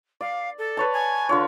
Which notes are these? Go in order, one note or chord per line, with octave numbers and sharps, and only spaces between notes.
D5 F5
A4
B4 C#5 A5
G#5
D3 F4 C#5